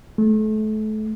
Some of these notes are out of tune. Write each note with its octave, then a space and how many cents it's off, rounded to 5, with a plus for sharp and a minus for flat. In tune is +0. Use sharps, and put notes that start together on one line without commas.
A3 -30